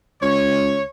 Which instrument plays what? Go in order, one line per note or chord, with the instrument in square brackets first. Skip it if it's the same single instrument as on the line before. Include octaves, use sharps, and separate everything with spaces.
[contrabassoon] C#2 [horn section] C#5